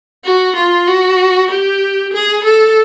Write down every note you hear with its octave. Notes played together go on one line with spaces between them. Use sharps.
F#4
F4
F#4
G4
G#4
A4